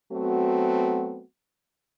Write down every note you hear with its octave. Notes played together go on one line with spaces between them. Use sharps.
F#3 A3 B3 C4 F#4